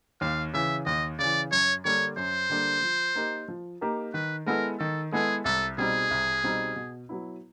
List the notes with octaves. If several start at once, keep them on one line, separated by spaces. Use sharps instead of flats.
D#2 F5
C#3 E3 E5
D#2 D#5
C#3 E3 D5
F#2 C#5
D3 G3 A#3 D4 C#5
F#2 C5
D3 G3 A#3 D4
F3
A#3 D#4 G4 A#4
F3
A#3 D#4 G4 A#4
D#3 B4
G#3 B3 E4 A4 A#4
D#3 A4
G#3 B3 E4 G#4 A4
C2 A4
B2 G3 C4 D#4 G#4
C2
B2 G3 C4 D#4
B2
F#3 B3 E4